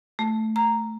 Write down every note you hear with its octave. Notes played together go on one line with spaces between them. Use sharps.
A3
A#5